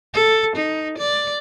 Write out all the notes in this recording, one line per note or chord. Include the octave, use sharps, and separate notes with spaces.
A4
D#4
D5